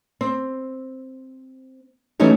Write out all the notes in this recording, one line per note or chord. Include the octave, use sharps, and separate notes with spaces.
C4
E3 F#3 A3 C#4 D#4 G4